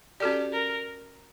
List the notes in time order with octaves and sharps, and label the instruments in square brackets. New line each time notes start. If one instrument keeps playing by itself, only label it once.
[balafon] C#4 F#4 A4 D5 [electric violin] G4
[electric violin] A#4